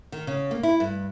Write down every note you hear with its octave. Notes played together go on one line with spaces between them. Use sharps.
D#3
C#3
A#3
E4
G2